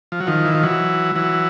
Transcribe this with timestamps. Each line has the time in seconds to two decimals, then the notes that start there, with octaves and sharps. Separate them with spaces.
0.12 F3
0.20 F#3
0.27 D#3 F3
0.45 E3
0.55 F3
0.63 E3 F#3
1.15 E3 F#3